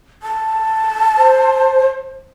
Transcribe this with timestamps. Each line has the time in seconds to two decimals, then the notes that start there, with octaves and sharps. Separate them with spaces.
0.23 A5
1.18 C5